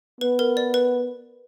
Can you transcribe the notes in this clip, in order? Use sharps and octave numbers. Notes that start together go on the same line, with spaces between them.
B3 B4
A#4
D5
B4